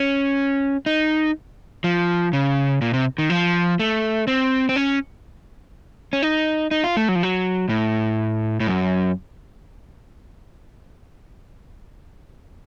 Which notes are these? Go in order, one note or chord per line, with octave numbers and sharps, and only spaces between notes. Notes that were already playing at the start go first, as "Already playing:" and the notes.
Already playing: C#4
D#4
F3
C#3
A#2
C3
D#3
F3
A3
C4
C4
C#4
C#4
D#4
D#4
F4
A3
F#3
F3
F#3
A2
A2
F#2